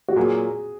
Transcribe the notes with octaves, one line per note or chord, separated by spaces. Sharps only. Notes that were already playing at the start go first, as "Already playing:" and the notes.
F#4
A#2 F#3 A#3 G#4